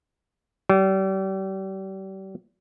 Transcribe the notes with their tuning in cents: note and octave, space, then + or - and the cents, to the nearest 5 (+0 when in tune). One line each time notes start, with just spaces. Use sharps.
G3 -35